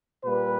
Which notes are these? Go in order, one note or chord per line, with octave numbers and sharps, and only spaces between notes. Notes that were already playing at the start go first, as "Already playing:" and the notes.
A#2 G3 A#3 B4